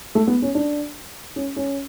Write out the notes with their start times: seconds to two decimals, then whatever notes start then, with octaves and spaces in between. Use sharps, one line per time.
0.15 A3
0.27 B3
0.42 C#4
0.55 D4
1.36 C#4
1.56 C#4